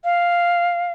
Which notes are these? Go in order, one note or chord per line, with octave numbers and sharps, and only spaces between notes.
F5